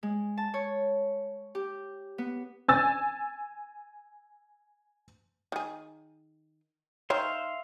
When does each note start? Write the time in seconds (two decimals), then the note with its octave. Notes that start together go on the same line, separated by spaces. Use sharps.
0.03 G#3
0.37 A5
0.54 C#5
1.55 G4
2.18 B3
2.68 G#5 E6 A6
5.52 D#3 G#4
7.10 D#3 C5 C#5 E5 F5 C6